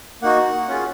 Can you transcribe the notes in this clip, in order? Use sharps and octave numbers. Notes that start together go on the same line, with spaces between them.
A#3 D#4 F#4 F#5
C#4 F4 G#4